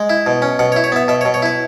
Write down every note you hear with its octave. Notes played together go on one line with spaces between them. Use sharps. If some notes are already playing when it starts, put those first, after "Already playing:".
Already playing: G#3
E4
B2
C#4
B2 F#5
C#5
E4
C#5
B3 E5
B2 E5
C#5
B2
C#5
E4 B4